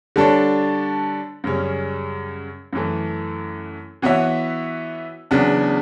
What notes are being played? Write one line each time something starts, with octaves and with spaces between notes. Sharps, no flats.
D3 G3 D4 A4 C#5
F#2 C#3 G3 C#4
F#2 E3 A3
E3 B3 F#4 C#5 E5
E2 C#3 F#3 B3 D4